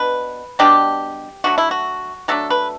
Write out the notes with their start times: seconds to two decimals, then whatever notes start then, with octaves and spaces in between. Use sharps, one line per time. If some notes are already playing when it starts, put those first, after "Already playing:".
Already playing: B2 D4 B4
0.59 B2 G3 D4 G4
1.44 F#3 A3 D4 F#4
1.58 E4
1.71 F#4
2.28 F#3 A3 D4 A4
2.50 B4